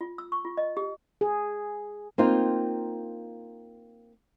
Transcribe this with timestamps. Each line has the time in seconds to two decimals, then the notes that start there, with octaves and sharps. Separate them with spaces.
0.01 F4
0.18 E6
0.32 C#6
0.45 F4
0.57 D#5
0.77 G4
1.21 G#4
2.18 A#3 C4 D#4 F4